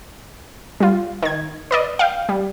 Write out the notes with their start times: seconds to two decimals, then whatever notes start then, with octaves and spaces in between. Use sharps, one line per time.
0.80 G3 F4
1.23 D#3 G#6
1.71 B4 D5 D#5
1.99 F5 G5
2.29 G3